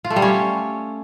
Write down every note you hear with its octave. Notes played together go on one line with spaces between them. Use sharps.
F4
A3
G3
C#4